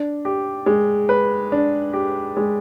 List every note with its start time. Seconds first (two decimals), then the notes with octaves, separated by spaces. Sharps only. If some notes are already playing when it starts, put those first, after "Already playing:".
Already playing: D4
0.25 G4
0.66 G#3
1.09 B4
1.52 D4
1.93 G4
2.37 G#3